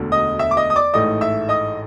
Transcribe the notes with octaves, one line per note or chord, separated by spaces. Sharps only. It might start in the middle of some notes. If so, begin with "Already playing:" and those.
Already playing: E1 D2 D3
D#5 D#6
E5 E6
D6
D#5 D#6
D#6
D5 D6
A1 G#2 E3 A3 D#5 D#6
E5 E6
D#5 D#6